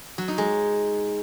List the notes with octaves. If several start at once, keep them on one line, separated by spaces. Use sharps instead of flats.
F#3
D#4
G#3